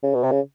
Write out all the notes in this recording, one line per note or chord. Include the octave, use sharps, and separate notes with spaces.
C#3
B2
C3
C#3